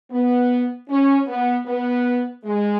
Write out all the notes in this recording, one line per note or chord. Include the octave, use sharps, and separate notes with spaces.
B3
C#4
B3
B3
G#3